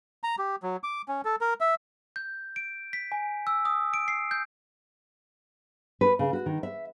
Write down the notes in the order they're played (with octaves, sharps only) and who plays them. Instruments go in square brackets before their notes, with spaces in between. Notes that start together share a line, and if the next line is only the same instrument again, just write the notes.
[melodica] A#5
G4
F#3
D6
C#4
A4
A#4
E5
[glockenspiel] G6
D7
B6
G#5
E6
D#6
D7
C7
G6
[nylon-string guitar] B4
C#3
F#4
D#3
E5